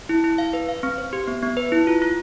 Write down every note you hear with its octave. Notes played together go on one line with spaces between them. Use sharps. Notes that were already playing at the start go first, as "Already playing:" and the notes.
E4
E4
F5
B4
F5
C4
C5
G4
B3
B3
B4
E4
F4
F4